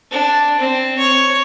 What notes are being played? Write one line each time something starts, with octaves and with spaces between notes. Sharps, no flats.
D4
C4
C#5